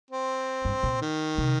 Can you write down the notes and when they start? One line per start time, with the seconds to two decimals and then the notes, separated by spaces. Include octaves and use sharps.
0.10 C4
0.65 G2
0.83 A#2
1.02 D#3
1.38 C3